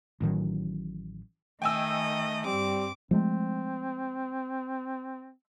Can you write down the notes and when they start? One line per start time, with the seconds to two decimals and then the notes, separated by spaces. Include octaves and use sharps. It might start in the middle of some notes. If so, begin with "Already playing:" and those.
0.21 A1 A2 D#3 F#3
1.62 D#3 A3 D#5 G5 G#5 E6
2.45 G2 G3 C4 D6
3.11 F3 G#3 A3 C4